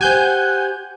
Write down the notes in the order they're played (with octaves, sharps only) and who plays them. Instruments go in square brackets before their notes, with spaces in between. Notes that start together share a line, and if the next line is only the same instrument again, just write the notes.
[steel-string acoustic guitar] G4 C5 [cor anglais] F#5 [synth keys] G#5 G6